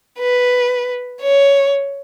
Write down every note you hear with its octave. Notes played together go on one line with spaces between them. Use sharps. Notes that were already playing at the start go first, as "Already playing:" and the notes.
B4
C#5